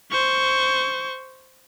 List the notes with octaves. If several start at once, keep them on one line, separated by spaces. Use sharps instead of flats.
C5 C#6